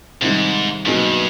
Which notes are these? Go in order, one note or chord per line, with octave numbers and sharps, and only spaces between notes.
G#2 C3 D#3 G3
G2 B2 F#3 A#3 D#4 G#4